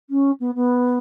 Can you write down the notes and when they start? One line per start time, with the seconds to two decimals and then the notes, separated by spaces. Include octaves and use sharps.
0.10 C#4
0.40 B3
0.55 B3